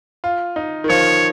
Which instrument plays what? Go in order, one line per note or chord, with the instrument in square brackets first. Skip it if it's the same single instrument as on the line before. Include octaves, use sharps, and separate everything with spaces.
[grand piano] F4
D#4
D#3
[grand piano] F3 [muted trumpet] C#5